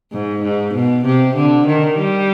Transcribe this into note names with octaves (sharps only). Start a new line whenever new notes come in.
G#2
G#2
B2
C3
D3
D#3
G3